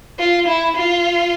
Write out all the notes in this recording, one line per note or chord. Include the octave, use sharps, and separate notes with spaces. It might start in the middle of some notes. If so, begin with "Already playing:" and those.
F4
E4
F4